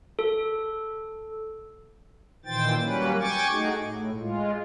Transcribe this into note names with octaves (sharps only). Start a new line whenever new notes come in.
A4
A#2 D#3 E3 C5 G5 A6
F#3 G3 A#3 C#4 B4
G5 G#5 C#6 D6 A6
A3 D#4 F#4 G#4
A2
G#3 F4